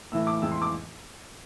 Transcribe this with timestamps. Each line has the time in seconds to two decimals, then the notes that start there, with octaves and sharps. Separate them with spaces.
0.12 A2 E3 A3 E6
0.27 D6
0.42 F2 E3 G#3 E6
0.51 C6
0.62 D6